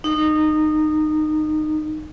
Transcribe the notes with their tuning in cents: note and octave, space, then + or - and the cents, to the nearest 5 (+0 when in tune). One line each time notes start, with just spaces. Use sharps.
D#4 -20